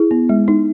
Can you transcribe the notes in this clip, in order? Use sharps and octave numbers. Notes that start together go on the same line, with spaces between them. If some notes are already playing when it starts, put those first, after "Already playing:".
Already playing: E4 G#4
B3
G#3
D#4